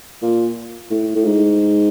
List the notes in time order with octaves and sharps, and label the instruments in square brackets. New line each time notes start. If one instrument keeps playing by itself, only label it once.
[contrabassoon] A#2
A2
A2
G#2